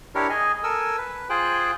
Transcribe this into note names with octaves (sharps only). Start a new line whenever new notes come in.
D4 E4 G4 A#4 C#5
G#4 D#5 G#5
A4 A#4 G#5 E6
B4
F4 G#4 C5 G5 F#6